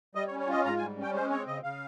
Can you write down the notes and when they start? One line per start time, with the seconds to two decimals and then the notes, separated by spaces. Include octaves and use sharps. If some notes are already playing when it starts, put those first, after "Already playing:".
0.15 G3 D#5
0.27 C#5
0.32 C#4
0.40 C#5
0.48 F4 D#5
0.65 G#2 A#5
0.77 G3 G#5
0.98 C#4 G5
1.14 G#3 C5
1.30 C4 C#5
1.47 C#3 D#5
1.63 C#3 F5